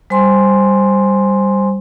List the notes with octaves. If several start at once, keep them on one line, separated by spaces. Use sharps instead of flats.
G3 C5 G#5 C6